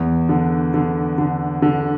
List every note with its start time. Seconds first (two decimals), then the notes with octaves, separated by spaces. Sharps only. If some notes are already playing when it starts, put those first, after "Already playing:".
Already playing: E2
0.29 D3
0.74 D3
1.18 D3
1.62 D3